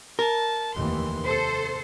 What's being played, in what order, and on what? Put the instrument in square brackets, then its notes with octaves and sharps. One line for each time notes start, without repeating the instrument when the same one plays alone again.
[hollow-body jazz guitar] A#4 [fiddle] A5
[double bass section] F1 D#2 E3 [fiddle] C6
[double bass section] C3 [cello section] A4 C5